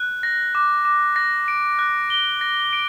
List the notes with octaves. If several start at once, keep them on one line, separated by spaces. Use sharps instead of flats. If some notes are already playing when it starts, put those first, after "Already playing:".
Already playing: F#6
A#6
D6
D6
A#6
D7
F#6
G7
A#6
D7